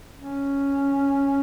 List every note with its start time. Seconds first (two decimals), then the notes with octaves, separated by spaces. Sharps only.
0.17 C#4